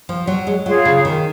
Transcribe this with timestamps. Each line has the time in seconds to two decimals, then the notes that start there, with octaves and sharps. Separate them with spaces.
0.09 F3
0.27 F#3
0.47 G#3
0.66 F#3 F4 G#4 C#5 F5
0.85 C#3
1.05 D#3